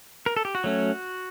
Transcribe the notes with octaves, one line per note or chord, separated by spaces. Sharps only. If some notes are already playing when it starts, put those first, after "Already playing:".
A#4
A4
G4
F#4
F#3 A3 C#4